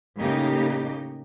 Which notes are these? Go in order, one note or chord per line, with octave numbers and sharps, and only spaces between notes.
A2 C#3 A#3 D#4 G4